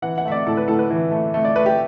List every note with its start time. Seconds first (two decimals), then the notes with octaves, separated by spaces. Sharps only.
0.02 E3 F#5
0.18 F#5
0.25 A3 E5
0.32 D5
0.46 A2 A4
0.57 B4
0.68 A2 A4
0.79 B4
0.90 E3
1.11 A3
1.34 A3
1.45 D5
1.56 A3 B4
1.66 G4